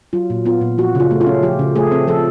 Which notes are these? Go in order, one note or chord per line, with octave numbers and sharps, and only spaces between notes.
F#3 F4
A#2
B3 F4
A#2
F3 F#4
C#3 F4
A3
F4
C#4
F3 G4
C#3
A3 G#4
C4
F3 A4